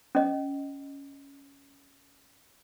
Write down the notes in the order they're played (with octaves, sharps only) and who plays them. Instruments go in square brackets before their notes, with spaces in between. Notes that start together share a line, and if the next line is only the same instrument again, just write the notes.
[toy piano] C#4 D#5